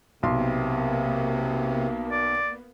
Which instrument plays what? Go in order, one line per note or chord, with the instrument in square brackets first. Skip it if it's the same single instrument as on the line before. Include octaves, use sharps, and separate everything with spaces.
[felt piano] B1 C6 [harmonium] C3 [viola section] A#3 B3
[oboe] D5